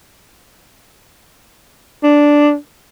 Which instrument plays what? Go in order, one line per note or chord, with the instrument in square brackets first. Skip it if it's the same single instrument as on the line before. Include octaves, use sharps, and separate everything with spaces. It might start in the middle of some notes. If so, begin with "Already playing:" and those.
[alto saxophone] D4